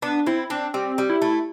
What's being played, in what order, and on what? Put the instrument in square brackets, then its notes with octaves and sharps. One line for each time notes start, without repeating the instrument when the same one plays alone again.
[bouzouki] B3 [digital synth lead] D4
[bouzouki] C4 [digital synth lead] E4
[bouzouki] C4 [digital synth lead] D4
[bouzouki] G3 [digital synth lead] C4
[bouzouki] G3
[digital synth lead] E4
[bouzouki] A3